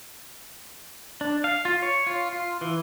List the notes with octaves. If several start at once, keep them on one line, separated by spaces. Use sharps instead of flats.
D4
F5
F4
C#5
F4
F4
E3